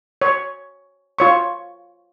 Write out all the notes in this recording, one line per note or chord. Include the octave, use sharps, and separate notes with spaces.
C#5
F4 C#5 C#6